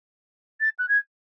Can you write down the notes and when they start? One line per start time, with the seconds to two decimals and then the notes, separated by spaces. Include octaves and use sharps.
0.60 A6
0.79 F#6
0.89 G#6